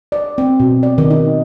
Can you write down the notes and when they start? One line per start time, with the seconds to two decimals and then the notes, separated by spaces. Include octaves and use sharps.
0.12 D5
0.38 C4
0.60 B2
0.83 D5
0.98 D#3
1.10 D#4